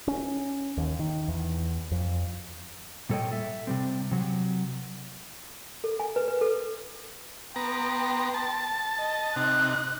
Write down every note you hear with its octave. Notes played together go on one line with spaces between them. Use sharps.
C#4
D#2
D#3
E2
F2
A#2 G3 A4 C#5 D#5 G5
A4 E5
C3 G3 C4
C3 F#3
A4
G#5
B4
B4
A4
B3 G5 A#5 C6
A5
D#5
C3 D#4 F#6